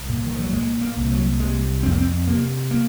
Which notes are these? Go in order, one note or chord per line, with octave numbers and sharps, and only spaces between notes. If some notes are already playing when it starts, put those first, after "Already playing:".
Already playing: C2
A#2
D#3
F3
F#3
A#2 G#3
A#3
C2
F#3
C3 G#3
F2 C4
A#3
C4
C3 A#3
A#3